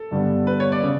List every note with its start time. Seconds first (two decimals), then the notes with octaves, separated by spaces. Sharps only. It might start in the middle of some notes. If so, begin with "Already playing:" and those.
Already playing: A4
0.11 G2 D3 G3 B3
0.47 B4
0.60 C#5
0.72 D5
0.83 C#3